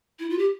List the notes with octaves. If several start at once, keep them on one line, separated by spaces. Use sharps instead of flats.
E4
F4
G4